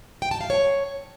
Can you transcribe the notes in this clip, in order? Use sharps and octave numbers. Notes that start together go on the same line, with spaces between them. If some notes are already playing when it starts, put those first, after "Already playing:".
G5
A5
F5
C#5